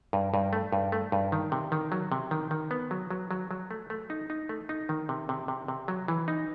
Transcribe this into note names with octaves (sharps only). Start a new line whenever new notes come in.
G2
G2
A3
G2
A3
G2
D#3
C3
D#3
F#3
C3
D#3
D#3
B3
F#3
F#3
F#3
F#3
A3
A3
D#4
D#4
A3
D#4
D#3
C3
C3
C3
C3
F#3
E3
D#4